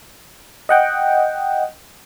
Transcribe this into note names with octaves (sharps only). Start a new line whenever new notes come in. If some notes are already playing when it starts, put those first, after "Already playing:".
D#5 F#5 G5